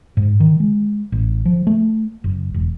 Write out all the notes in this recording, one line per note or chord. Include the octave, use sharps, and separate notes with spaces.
G#2
D#3
G#3
A1
F3
A3
F#1
E1